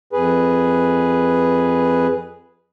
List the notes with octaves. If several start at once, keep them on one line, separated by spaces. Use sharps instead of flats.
F2 G#4 B4